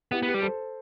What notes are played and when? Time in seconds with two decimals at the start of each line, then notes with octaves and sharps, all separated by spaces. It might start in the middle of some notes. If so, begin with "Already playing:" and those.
0.12 B3 E4 G4
0.23 B3 G4 B4
0.34 G3
0.42 A4 C5